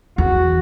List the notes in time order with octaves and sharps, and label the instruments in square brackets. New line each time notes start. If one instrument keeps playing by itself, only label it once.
[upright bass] E2 [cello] F#4